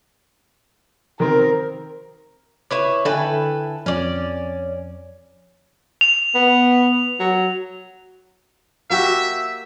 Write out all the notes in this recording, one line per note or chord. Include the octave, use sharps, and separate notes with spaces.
D#3 C4 A#4
E4 B4 C#5 D6
D3 E4 A4 B4 G5 G#5
F2 C#4 D5
F7
B3
F#3
A#3 F#4 G4 E5